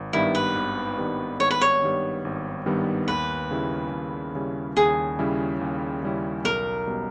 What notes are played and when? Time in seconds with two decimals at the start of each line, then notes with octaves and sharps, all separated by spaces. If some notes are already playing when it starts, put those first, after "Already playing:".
Already playing: G#1
0.13 G2 D#3 G3 B3 E4
0.35 B4
0.55 G#1
0.98 G2 D#3 G3 B3
1.40 G#1 C#5
1.51 B4
1.61 C#5
1.82 G2 D#3 G3 B3
2.25 G#1
2.66 G2 D#3 G3 B3
3.08 D#2 B4
3.51 C#3 G3 C#4 E4
3.92 D#2
4.35 C#3 G3 C#4 E4
4.76 D#2 G#4
5.19 C#3 G3 C#4 E4
5.61 D#2
6.03 C#3 G3 C#4 E4
6.44 B1 A#4
6.87 B2 G3